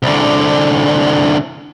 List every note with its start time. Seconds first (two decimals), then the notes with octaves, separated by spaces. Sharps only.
0.03 C2 D3